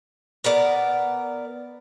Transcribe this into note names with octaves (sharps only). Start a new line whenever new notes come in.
B3 A#4 D5